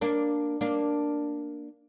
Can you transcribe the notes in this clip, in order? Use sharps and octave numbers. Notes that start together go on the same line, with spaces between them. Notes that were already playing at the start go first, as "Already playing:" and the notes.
A#3 D4
A#3 D4